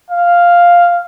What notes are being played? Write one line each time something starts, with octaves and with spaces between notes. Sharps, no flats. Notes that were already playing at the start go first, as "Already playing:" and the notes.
F5